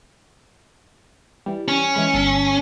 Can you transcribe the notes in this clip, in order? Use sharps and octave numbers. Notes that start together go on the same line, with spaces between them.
E3 G3
C#4
E3 G#3 B5
G1 A4 C7